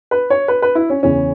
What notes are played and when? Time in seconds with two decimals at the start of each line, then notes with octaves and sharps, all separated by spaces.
0.11 B4
0.30 C#5
0.48 B4
0.62 B4
0.75 E4
0.90 C#4
1.03 E2 C#3 E3 C#4